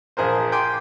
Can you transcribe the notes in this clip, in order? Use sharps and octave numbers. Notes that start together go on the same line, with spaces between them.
A#1 G#4 A#4 C5
G5 G#5 C6 D6